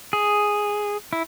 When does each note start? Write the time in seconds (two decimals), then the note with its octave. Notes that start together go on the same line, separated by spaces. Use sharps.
0.13 G#4
1.13 E4